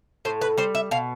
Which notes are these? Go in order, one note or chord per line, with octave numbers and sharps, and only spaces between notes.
A2 C5
B4
G3 C5
E5
B2 F5